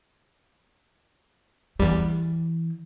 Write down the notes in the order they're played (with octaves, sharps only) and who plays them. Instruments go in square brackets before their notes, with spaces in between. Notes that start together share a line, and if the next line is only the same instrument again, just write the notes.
[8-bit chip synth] E2 G3 [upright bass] E3